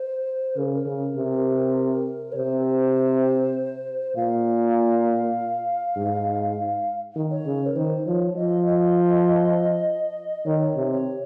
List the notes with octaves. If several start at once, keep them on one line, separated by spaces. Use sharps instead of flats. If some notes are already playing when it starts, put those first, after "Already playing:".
Already playing: C5
C#3 A#4
A#4
C#3
C3
C#5
C3 C5
A#2 F5
G#2
D#3
C#5
C#3
A#4
D#3 C5
F3 C#5
F3 D#5
D#5
D#3 C#5
C3
C#5